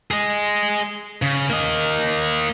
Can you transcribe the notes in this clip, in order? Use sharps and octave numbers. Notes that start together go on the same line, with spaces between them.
G#4 D#5
C#3
A#3 D#5